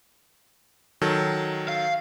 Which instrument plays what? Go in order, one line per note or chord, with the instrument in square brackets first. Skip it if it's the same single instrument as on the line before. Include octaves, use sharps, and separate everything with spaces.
[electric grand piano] D#3 F#3 A4
[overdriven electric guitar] F5